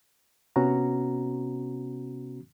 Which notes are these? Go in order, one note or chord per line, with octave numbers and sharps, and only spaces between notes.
C3 B3 C#4 F#4 A#5